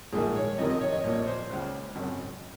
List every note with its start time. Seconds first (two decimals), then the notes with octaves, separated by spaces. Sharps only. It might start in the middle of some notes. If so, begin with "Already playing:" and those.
0.12 A#1 G#2 D#3 G#4
0.36 C#5
0.58 F2 C3 D#3 D#5
0.70 D#5
0.81 C#5
0.92 D#5
1.04 A#1 A#2 C#5
1.27 C5
1.50 C#2 C#3
1.95 G#1 F#2 C#3